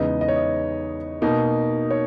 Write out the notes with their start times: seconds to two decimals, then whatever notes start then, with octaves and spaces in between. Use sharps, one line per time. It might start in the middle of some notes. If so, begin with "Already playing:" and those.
Already playing: E2 C#3 G#3 B3 D#4 D#5
0.21 D#5
0.28 C#5
0.36 D#5
1.22 B2 A#3 D#4
1.90 C#5